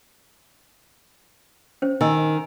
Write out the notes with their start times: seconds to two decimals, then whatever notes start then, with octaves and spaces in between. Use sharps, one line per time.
1.82 C#4 C5
2.01 D#3 D#5 G#5 E6